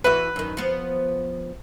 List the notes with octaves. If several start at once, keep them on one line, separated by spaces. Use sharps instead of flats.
E3 E4 F#4 B4
F#2 D#3
F3 B3